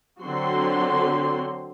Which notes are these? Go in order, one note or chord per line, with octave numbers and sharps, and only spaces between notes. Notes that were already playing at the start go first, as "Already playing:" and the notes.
D3 F#3 C4 F#4 C6